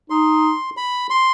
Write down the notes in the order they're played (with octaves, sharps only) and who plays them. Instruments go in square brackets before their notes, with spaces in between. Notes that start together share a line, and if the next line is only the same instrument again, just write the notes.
[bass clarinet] D#4 [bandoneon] C6
[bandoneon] B5
C6